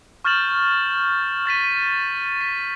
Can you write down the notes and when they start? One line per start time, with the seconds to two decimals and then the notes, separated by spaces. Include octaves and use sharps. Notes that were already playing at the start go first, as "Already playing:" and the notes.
0.25 C#6 F6 G6 A6 E7 F#7
1.46 F6 A6 B6 D#7
1.64 D#7
2.41 B6